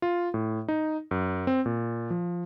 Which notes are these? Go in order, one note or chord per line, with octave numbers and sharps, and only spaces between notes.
F4
A2
D#4
F#2
C4
A#2
F3